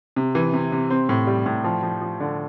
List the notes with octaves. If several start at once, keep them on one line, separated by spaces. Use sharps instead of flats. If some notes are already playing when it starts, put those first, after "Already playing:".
C3
E3
C3
C3
C4
A2
G3
A2
F3
F3
F3
D3